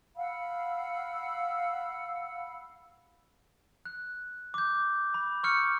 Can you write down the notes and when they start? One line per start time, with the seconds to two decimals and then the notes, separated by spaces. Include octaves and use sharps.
0.17 F5 F#5 B5 E6
3.85 F#6
4.54 D6 G6
5.14 B5
5.43 C#6 D6 E6 F6 G6 C#7